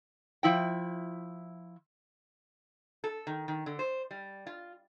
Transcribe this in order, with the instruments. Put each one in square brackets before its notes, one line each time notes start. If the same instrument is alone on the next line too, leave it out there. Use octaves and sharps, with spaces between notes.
[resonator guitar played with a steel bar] F3 E4 G5
A4
D#3
D#3
D3
C5
G3
F4